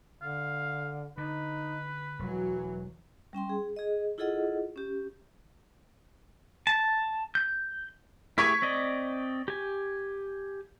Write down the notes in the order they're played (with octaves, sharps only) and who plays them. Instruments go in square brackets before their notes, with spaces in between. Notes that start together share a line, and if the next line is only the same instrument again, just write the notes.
[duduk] D3 [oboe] F5
[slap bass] D3 [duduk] D#4 [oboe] B4
[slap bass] E1 [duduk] E3 [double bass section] F#3
[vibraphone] G3 C#4 G5 C6
G#4
G#4 D#5
E4 F4 G#4 A4 D#5 F#5
C#4 G4
[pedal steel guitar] A5
G6
[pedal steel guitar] E4 G4 G#4 [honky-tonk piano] C#6 G#6 B6
[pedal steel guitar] C4 D5 D#5
G4 G#5